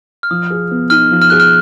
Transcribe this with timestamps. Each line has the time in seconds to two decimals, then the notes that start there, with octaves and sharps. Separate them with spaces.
0.23 F6
0.31 F3 D#6
0.50 G#4
0.71 B3
0.90 D#4 F6
1.11 F3
1.22 F6
1.30 G#4 F#6
1.40 F6